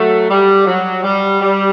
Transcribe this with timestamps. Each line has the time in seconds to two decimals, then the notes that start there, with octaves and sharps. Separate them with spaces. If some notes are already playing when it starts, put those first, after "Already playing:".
Already playing: F#3 A3
0.30 G3
0.66 F#3
1.04 G3
1.41 G3